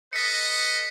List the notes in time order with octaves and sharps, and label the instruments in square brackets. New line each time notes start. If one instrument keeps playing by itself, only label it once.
[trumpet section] A4 B4 D#5 [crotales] B6 C#7